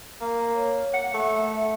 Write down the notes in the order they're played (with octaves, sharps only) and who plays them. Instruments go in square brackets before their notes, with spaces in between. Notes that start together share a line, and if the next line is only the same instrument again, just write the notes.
[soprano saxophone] A#3
[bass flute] C#5
[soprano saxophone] F#5
[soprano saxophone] A3 [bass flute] E5